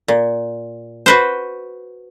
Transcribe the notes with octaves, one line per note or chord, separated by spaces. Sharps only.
A#2
F#4 B4 C5